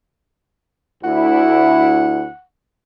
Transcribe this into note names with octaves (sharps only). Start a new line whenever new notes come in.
D2 E4 F#5